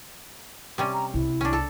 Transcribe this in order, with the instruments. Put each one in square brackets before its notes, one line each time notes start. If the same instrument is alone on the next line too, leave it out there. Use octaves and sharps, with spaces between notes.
[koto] C3 G3 C#4
[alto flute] A#5
[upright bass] C2 [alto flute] E4
[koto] C#4 D4
A4